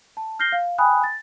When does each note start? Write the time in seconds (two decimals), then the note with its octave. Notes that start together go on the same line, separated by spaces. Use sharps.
0.17 A5
0.39 F6 G6 A#6 C7 G7
0.52 F5
0.78 G5 G#5 B5 D#6 F#6
1.04 A6